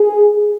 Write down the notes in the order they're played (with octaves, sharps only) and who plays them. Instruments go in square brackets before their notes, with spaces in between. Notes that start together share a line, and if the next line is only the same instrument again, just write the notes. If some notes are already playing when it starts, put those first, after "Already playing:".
Already playing: [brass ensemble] G#4